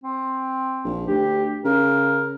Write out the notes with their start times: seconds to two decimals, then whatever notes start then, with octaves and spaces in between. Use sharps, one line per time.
0.04 C4
0.84 A#1
1.07 D2 G4
1.65 C#3 A#4